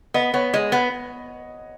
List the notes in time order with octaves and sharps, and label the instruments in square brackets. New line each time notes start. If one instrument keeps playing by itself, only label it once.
[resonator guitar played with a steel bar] B3 [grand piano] D#5
[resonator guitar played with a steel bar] B3 [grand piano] C#5
[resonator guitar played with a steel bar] G#3 [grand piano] D#5
[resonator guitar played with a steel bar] B3 [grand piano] F#5